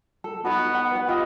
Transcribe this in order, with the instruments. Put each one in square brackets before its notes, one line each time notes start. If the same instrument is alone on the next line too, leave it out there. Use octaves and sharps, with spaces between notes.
[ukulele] A4
[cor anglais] B3 [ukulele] D#4 F#4
[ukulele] F#5
B4 F#5
[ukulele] F4 G4 [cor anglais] D#5